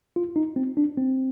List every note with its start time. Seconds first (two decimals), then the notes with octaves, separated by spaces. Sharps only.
0.16 F4
0.36 D#4
0.56 C4
0.77 D4
0.97 C4